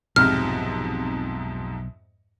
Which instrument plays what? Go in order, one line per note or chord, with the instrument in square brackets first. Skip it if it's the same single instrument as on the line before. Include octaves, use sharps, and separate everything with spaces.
[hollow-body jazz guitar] B1 [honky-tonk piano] F2 G#2 C3 [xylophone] F6